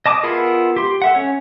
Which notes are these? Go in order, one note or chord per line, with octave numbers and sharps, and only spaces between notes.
D#5 A5 D6 D#6
B3 E4 F4 G#4 A#4
G4 C6
A4 E5 F#5
C#4 C#5